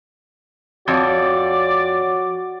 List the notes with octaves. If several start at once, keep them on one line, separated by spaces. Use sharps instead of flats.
F2 F#4 C#5 D5